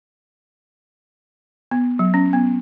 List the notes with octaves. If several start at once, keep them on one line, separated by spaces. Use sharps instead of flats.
B3
F#3
C#4
B3